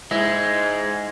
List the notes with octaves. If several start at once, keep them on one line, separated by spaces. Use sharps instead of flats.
G#2 G#3 E4